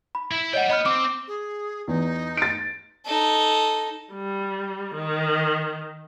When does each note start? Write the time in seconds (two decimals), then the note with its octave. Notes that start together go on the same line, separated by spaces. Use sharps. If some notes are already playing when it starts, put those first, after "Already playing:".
0.15 B5
0.31 E4
0.53 G3 C#5 D#5 F#5 G5
0.69 B3 D#5 B5 F6
0.86 C4 D6
1.27 G#4
1.88 E2 D#4
2.37 A6 D7
3.06 D#4 A4
4.13 G3
4.95 D#3